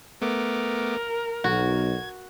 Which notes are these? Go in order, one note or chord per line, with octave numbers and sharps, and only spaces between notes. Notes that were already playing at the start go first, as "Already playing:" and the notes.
A3 B3 A#4 D6
B1 F#4 G#6